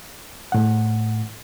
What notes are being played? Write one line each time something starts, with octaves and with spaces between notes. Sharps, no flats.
A2 F#5